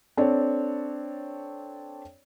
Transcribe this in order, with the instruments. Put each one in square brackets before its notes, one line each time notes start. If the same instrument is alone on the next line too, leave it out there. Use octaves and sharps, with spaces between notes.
[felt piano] C4 D4 A4 C#5 D5